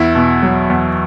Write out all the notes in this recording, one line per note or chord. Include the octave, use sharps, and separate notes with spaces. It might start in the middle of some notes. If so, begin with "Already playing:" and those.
Already playing: E2 E4
B2
F#3
E2